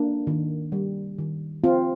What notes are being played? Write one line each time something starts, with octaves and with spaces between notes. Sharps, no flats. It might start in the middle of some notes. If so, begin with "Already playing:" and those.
Already playing: A#3 D4
D#3
G3
D#3
C4 F4